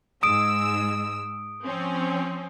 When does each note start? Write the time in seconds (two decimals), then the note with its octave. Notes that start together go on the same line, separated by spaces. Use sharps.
0.23 G#2 G#3 D#6 E6 D7
1.65 F3 C4 C#4